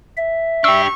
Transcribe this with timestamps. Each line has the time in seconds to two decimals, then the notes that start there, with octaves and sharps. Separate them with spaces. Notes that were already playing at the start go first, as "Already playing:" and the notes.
0.17 E5
0.64 D4 G4 C#6 E6